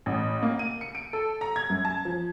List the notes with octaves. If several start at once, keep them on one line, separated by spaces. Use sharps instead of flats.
A1
A#3
D#7
C#7
D7
A4
A#5
G#6
F#2
A5
F3